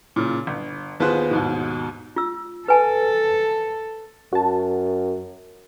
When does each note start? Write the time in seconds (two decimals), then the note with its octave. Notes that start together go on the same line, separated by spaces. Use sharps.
0.16 A#2 C#3
0.47 G1
1.00 D#2 B3 F4 G#4 C5 F#6
1.31 D#2 G#2 B2
2.16 F4 E6
2.68 A4 B4 G#5 A5
4.33 F#2 F#4 A5